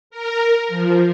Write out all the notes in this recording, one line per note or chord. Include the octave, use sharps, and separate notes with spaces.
A#4
F3